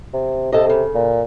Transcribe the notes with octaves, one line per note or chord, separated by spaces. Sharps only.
C3
C3 A4 D#5
C#3
A#2